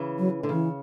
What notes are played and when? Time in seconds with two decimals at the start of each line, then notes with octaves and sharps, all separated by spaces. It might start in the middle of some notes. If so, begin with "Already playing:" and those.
Already playing: C#3 E3
0.19 F#3
0.43 D3
0.49 C#3 E3